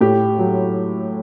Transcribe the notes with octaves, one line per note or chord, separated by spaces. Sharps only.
A2 G4
F#3